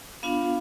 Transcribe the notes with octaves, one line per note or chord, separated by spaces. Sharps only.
B3 D4 F4 F5